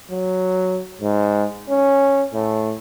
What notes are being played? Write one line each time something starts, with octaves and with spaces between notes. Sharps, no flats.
F#3
G#2
C#4
A2